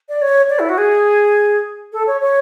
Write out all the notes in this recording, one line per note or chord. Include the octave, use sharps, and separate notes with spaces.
D5
C#5
D5
E4
F#4
G#4
A4
C#5
C#5